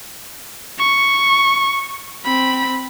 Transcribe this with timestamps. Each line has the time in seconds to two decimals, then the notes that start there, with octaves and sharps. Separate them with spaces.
0.78 C#6
2.24 C4 B5